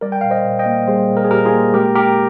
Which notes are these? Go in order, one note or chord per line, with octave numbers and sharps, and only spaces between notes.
G3 A#4 D5
G5
A#2 F5
C5 D#5
A#2
D#5 G5
A#3
G3 G#4 C5
A#2
A#4
G#4
A#2 G4 A#4
F4 G#4
A#3
G#3 G4 A#4
G#3 G4 A#4